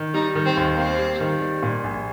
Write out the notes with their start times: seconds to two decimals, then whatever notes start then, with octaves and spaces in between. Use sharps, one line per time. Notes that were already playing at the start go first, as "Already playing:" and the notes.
Already playing: D#3
0.14 G3 D#4
0.35 D#3
0.46 C4
0.57 D#2
0.77 A#3 C4
0.98 G3
1.20 D#3
1.41 G3
1.63 A#2
1.84 A#1